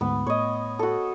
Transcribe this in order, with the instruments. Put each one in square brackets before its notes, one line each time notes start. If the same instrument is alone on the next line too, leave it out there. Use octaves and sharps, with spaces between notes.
[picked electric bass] D2 G#2 [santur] B3
[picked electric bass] A2 [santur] C#5 D#5
[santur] F#4 A4